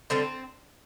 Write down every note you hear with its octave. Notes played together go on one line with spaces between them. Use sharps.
D3 G3 C4